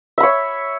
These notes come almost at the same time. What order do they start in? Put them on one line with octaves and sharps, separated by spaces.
E5 B5 C#5